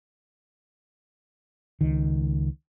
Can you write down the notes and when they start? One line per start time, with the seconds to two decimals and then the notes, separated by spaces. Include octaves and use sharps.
1.81 C#2 D#3